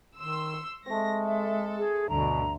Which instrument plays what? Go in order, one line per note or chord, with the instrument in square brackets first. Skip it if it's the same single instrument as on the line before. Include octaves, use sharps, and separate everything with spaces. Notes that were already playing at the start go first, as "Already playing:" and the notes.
[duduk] D#3 [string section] C6 E6
[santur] C#6
[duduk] G#3 [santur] A3 C4 [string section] A#6
[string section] A4 [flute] E5
[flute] G#4
[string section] D2 G2 D3 [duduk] B2 [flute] A#5